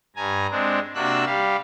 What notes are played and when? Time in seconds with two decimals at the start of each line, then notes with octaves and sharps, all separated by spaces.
0.16 G2 G#5 A#5
0.51 G#3 C4 D4
0.95 C3 A#3 D4 F#4 E6 F#6
1.25 G3 G4 F5